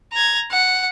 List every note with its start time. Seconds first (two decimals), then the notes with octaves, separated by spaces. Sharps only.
0.13 A#5 G#6
0.51 F#5